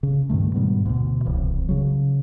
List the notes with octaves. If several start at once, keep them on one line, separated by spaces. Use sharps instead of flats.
C#3
G2 A#2 D#3 A3
G#2 B2 G3 B3
D2 B2
D1 C2 E3
C#3 F#3